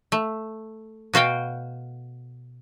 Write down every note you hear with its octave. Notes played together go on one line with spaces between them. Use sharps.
A3
B2 F#4 F5 G5